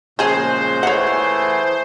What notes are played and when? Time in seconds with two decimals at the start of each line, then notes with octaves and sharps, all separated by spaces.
0.19 A#2 C#3 F3 G#3 G#4 C5
0.83 E3 A3 G#4 C#5 F#5